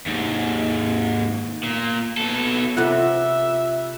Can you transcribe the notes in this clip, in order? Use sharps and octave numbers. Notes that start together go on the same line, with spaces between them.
D#2 G#2
A#2
B2 A4
C3 F4 A4 E5 F#5 F#6